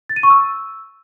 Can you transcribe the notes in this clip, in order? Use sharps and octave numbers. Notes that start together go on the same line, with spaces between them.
A6
D#7
C#6
E6